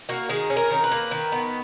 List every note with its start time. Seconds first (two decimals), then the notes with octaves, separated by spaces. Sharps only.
0.09 A#3 F#4
0.29 D#3 G#4
0.50 C#4
0.56 A#4
0.71 D#3
0.84 B4
0.91 A#3
1.11 D#3
1.32 B3